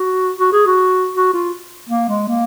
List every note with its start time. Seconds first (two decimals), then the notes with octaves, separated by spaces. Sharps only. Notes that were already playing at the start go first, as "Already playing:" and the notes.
Already playing: F#4
0.39 F#4
0.53 G#4
0.66 F#4
1.15 F#4
1.34 F4
1.89 A#3
2.09 G#3
2.28 A#3